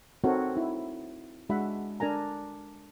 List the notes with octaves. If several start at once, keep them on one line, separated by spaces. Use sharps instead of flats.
C4 D#4 F#4 A4 A#4 C#5
D#4 E4
G#3 D4 F#4 E5 F#5 B5
D4 A#4 G#5 A#5